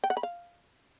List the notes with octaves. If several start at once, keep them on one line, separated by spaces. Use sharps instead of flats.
G5
F#5
B5
F5